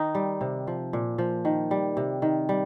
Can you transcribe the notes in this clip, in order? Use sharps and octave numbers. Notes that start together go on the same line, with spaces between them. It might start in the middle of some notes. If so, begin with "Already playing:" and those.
Already playing: D#3 D#4
G3
C3
F3
A#2
F3
D#3
G3
C3
D#3
G3